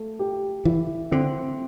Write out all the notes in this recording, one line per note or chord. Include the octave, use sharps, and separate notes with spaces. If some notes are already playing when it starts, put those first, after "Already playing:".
Already playing: A3
G4
E3 E4
D3 C4